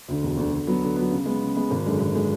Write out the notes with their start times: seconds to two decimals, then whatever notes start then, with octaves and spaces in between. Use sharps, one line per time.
0.08 D2 D3
0.23 E1
0.37 D2 D3
0.52 D3
0.67 F#3 B3
0.82 D3
0.96 F#3 B3
1.11 C#3
1.26 G#3 B3
1.41 C#3
1.56 G#3 B3
1.71 G#1
1.86 F#2 D3 G#3
2.00 G#1
2.15 D3 G#3